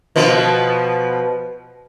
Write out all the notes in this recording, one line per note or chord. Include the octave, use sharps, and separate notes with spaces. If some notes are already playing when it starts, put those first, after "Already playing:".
B2 F3 B3